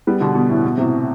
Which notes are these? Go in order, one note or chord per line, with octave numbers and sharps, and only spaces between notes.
G3 B3
B2 D3
B2
A2
B2
A2 C3